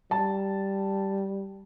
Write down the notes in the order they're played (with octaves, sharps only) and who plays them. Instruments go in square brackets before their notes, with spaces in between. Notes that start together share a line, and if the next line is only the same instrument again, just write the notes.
[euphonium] G3 [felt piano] A5